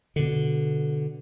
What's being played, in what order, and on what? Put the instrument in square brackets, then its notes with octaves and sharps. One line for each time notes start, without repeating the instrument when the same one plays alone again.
[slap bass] B2 D3